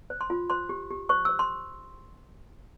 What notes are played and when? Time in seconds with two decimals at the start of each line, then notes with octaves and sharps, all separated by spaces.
0.10 C5
0.21 C6
0.30 F4
0.50 C5 C6
0.69 G4
0.90 G4
1.09 C5 C#6
1.25 C5 E6
1.39 C6